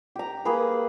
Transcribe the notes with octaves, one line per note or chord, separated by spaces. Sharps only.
G4 A#5
A#3 G#4 B4